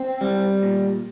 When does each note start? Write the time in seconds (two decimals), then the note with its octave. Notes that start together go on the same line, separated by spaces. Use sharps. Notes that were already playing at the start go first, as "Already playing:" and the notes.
Already playing: C4
0.21 G3
0.63 A#2